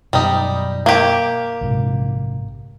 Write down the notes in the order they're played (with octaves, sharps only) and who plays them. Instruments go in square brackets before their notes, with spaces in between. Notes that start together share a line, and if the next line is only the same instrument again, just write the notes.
[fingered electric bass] F#2 B2 [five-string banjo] G3 D#4
[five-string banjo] A#3 G4
[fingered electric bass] A#1 G#2 C3